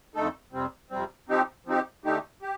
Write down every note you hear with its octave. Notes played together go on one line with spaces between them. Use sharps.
F2 D3 A3 D#4 A4
F2 C3 G3 C4
F2 C3 G3 C4
F3 C4 D#4 G4
F3 C4 D#4 G4
D3 A3 D#4 G4
G4